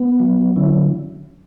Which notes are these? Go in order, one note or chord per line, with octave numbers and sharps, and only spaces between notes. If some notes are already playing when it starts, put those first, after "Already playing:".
Already playing: B3
F#3
D3 C#4 E4